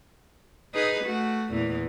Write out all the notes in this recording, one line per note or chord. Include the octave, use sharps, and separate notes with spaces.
D#4 G#4 B4
A3 F#4
E2 A#2 E3